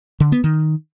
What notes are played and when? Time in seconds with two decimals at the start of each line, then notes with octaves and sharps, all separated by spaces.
0.20 D3
0.32 B3
0.44 D#3